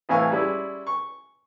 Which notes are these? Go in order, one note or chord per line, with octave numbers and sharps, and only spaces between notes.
C2 A2 E3 F5 G#5 C#6
G3 G#3 C#4 E4
C#6